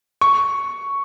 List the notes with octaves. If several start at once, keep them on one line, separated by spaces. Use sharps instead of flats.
C#6